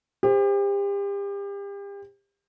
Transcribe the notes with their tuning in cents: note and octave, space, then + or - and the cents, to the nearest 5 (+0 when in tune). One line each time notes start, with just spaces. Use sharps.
G4 +35 C5 +0